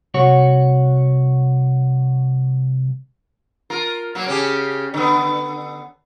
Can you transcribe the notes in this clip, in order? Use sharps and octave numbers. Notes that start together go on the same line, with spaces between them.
C2 F#4 C#5
F4 A#4
F#3 A#3
C#3 C#4 G4
D3 B3